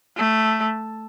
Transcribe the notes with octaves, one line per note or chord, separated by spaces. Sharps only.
A3